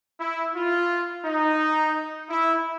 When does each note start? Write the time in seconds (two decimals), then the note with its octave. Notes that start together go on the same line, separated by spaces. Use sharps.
0.20 E4
0.55 F4
1.25 D#4
2.30 E4